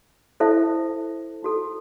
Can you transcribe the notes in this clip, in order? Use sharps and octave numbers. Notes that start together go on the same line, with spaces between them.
E4 A4 C5 E5
D#4 F#4 A4